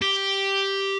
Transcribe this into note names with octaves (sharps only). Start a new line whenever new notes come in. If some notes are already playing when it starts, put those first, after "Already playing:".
G4